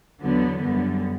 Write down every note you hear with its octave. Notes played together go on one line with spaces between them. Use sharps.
E2 D3 F#3 B3
F#2 D3 G3 B3